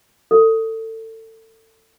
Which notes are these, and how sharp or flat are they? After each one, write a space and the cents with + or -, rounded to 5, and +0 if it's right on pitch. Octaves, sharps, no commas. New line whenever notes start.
A4 +25